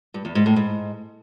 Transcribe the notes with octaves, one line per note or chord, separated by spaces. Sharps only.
G2
E2
G#2
A2
G#2